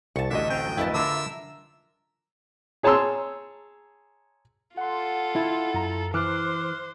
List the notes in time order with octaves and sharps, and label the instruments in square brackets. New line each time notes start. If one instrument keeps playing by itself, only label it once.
[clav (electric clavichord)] C2 [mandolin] A5 C#6
[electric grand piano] A1 D2 D#5 [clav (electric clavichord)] D4 [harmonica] E5
[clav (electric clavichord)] C4 C5 F5 [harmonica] G5
[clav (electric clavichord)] F2 [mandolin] E4 B4 A5
[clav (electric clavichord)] D3 D4 F4 [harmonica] A#4 E6
[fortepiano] G#4 C#5 A5 A#5 C6 E6
[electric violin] F4 A4 [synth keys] F#5 C6
[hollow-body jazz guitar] E4
[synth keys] F#2 A#5
[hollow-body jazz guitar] E3 [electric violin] C5 [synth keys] D6 F6 F#6